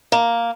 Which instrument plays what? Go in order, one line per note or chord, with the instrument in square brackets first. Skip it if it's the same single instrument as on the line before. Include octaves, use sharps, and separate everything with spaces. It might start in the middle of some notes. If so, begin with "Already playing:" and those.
[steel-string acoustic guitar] A#3